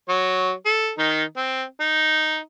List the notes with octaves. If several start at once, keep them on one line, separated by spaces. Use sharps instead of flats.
F#3 C#5
A4
D#3 D#4
C4
D#4